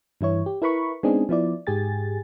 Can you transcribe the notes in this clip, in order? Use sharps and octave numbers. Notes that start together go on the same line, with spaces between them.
G2 E3 E4 C#5
G4
E4 A#4 B4 B5 C#6
G#3 B3 C4 D4 D#4 G#4
F3 B3 E4 D5
G#2 G4 G#4 G#5 A6